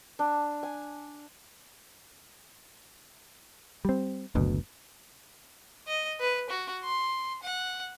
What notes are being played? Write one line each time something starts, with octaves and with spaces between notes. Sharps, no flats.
D4
G#5
G3 C4
F#1 D2 B2
D#5
B4
F#4
C6
F#5